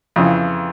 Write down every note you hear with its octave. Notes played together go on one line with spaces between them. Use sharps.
F2 C#3 E3